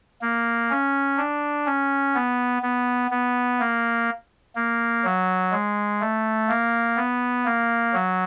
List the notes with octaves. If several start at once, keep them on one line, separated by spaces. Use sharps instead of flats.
A#3
C#4
D4
C#4
B3
B3
B3
A#3
A#3
F#3
G#3
A3
A#3
B3
A#3
F#3